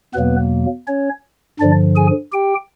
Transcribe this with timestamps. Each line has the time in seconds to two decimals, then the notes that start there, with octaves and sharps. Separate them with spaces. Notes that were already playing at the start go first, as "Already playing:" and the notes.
0.14 E2 B2 F#3 A#3 B3 B4
0.88 C#4 C#5
1.60 G2 D3 F3 D4 D5
1.96 G#4 G#5
2.32 G4 G5